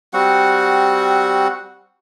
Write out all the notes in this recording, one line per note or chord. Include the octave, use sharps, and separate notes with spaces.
G3 C4 F#4 F#5